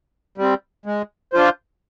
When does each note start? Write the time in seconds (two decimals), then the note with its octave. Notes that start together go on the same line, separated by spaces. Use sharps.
0.38 G3 C4
0.86 G#3
1.33 D4 F4 C5